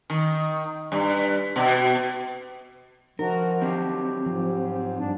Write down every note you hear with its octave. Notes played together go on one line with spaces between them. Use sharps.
D#3
G2
B2
F3 D#4 F#4 A#4
F#3 C4 G4
G#2 F3
G2 D4